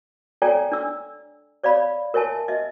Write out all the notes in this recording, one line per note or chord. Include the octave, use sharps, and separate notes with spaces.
A4 C#5 D5 G5 G#5 A#5
D4 E6
C#5 D5 F5 B5
A#4 C#5 E5 G#5 A5
D#5 E5